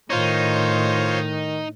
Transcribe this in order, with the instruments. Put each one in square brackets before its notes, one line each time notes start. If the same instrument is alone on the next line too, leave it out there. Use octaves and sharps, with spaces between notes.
[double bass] A2 [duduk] D#3 [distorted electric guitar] D#4 [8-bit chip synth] F4 C5 C#5